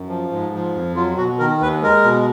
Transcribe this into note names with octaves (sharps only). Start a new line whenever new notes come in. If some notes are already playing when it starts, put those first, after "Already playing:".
Already playing: F#2
F3
G#2
F3
F2
F#3 F4
B2 F#4
D#3 A#4
D#2 B4
G#3 A#4
B2